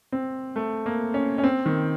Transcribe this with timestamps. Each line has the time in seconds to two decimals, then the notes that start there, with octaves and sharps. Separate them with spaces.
0.12 C4
0.56 A3
0.86 A#3
1.14 C#4
1.38 C#4
1.44 C4
1.66 D#3